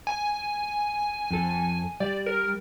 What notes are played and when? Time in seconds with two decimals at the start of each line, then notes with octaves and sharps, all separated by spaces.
0.07 G#5
1.31 F2 A4
2.00 G3 D5
2.26 A#4